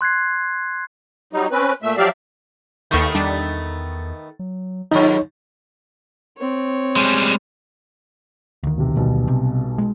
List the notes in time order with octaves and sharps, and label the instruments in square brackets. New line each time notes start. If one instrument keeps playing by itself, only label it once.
[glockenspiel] C6 F#6 G#6 C7
[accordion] F#3 G3 D#4
C4 C#4 B4
A#2 A3 E5
F3 F#3 G4 D5 E5 F5
[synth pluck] D#2 C#6 G6 [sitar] D#3 A3 B3
[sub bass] E2 [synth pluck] G3 D4
[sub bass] F#3
[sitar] D#2 G#2 F4 [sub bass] F#3 [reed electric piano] D#4 C#5
[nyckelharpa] C4 C#5
[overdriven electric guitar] G3 G#3
[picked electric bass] D2 D#3
[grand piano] B1 C3
B1 B2 G3
[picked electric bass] C3
G#3